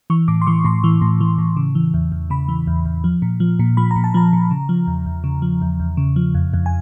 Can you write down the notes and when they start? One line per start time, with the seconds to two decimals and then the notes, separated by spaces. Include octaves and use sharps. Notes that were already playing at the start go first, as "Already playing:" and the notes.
0.10 E3 C#6
0.28 A2 D6
0.42 C6
0.47 E3 C#6
0.65 A2 C6
0.84 E3
1.02 A2
1.21 E3
1.38 A2
1.57 C#3
1.75 E3
1.94 E2
2.12 E2
2.30 C#3 B5
2.48 E3
2.67 E2
2.85 E2
3.04 F3
3.22 A#2
3.40 F3
3.59 A#2
3.77 F3 B5
3.91 A#5
3.96 A#2
4.04 A5
4.14 F3 A#5
4.33 A#2
4.51 C#3
4.69 F3
4.87 E2
5.06 E2
5.24 C#3
5.42 F3
5.62 E2
5.80 E2
5.97 C#3
6.16 F3
6.35 F2
6.53 F2
6.66 G#5